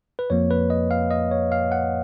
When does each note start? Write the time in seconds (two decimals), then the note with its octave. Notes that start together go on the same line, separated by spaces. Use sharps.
0.19 B4
0.30 F2 F3 A#3 C#5
0.51 B4
0.70 D#5
0.91 F5
1.11 D#5
1.31 C#5
1.52 F5
1.72 F#5